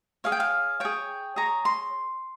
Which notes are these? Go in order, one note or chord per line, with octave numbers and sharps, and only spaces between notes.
G#4 C#5 F5
G5
F5
G#4 C#5 G5
G#4 C#5 A#5
C6